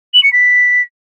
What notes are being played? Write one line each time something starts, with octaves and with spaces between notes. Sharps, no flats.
F#7
C#7
B6